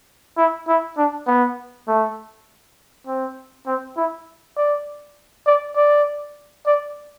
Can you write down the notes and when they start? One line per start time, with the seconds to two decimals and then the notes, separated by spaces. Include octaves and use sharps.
0.37 E4
0.68 E4
0.97 D4
1.27 B3
1.88 A3
3.07 C4
3.66 C4
3.97 E4
4.57 D5
5.47 D5
5.76 D5
6.67 D5